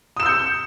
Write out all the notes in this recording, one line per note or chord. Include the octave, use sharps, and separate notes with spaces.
D#6 E6 G6 C#7 E7